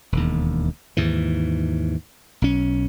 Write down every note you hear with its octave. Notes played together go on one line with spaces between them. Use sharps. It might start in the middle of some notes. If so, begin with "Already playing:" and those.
E1 D#2
D#2 G#2 E3
B1 C#4